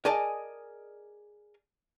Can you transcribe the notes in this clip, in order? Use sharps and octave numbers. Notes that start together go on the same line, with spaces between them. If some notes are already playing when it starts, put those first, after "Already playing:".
G#4 A#4 D5 D#5 G#5 A5